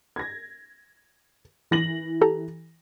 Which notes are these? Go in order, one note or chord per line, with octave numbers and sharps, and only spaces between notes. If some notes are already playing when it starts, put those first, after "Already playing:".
G#6 A#6
E3 A#6 F#7
G4 A4 A#5